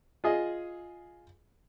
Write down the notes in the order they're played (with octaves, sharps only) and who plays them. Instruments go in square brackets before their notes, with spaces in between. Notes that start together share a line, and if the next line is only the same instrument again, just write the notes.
[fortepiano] F4 G#4 D#5